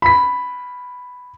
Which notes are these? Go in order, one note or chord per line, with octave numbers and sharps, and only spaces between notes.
B5 B6